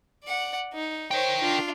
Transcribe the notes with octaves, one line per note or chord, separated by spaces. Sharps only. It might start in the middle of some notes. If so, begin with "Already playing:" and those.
D5 F#5
D#4
A#4 C5 C#5 G5
D4 F4